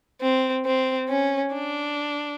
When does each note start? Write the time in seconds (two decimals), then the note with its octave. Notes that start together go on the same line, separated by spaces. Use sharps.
0.21 C4
0.65 C4
1.09 C#4
1.53 D4